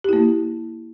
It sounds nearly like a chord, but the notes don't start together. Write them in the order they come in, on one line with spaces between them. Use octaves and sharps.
G4 E4 A#3